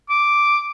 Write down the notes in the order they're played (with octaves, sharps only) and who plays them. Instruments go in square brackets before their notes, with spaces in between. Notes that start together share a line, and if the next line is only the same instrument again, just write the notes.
[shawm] D6